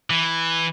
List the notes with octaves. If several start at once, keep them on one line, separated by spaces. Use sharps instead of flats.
E3